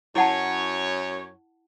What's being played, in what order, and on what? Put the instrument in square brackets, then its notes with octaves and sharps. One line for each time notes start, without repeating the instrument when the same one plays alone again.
[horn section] F#2 C#5 [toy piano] E4 F#5 A5